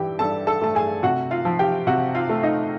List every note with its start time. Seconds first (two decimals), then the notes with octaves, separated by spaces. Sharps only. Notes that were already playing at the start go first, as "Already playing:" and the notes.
Already playing: G2 E3 G4 G5
0.19 G2 A4 A5
0.47 A4 A5
0.62 A3 A5
0.75 G#4 G#5
1.03 C3 F#4 F#5
1.31 F4 F5
1.45 F3
1.59 G4 G5
1.87 C3 F#4 F#5
2.15 F4 F5
2.29 A3
2.43 D#4 D#5